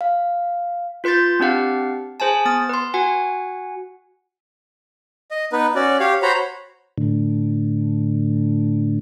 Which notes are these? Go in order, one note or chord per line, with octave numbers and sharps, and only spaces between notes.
F5
F4 B4 C6 G6 A6
C4 D4 G4 F5 F#5
G#4 C5 G#5 A5
B3 D#6 A6
B4 C6
F#4 F#5 G#5
D#5
B3 D#4 B4
C#4 F#4 D5
G4 C#5 F5
F#4 C5 C#5 A#5 B5
A2 D3